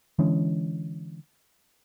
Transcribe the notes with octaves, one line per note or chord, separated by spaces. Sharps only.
D3 E3 G#3 C#4